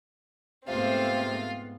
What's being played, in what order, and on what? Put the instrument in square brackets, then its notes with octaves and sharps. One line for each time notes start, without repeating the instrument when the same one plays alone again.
[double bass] G#2 B3 [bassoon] C3 [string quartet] A3 C4 [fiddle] F4 F5